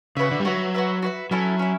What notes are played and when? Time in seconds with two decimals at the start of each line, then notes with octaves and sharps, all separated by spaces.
0.17 C#3 F#4 B4 E5
0.31 D3
0.40 G3
0.45 F#3 F#4 B4 E5
0.74 F#4 B4 E5
1.02 F#4 B4 E5
1.31 F#3 C#4 E4 A4
1.59 C#4 E4